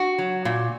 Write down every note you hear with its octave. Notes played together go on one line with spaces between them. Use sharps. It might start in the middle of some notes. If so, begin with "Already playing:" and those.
Already playing: F#4
F#3
A#2